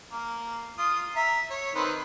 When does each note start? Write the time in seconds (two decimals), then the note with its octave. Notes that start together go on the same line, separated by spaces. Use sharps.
0.12 A#3
0.78 F4 D#6
1.16 E5 A#5
1.50 C#5
1.75 D#3 C4 B4